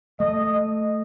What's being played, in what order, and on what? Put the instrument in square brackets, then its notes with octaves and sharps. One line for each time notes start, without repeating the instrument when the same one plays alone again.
[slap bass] A3 [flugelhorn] D#5